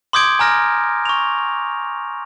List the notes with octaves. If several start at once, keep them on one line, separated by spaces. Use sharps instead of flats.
C6 D6 D#6 G6 G#6 D7
G#5 A#5 F6 A#6
C#6 F7